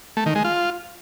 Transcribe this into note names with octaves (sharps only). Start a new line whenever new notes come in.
A3
D#3
G#3
F4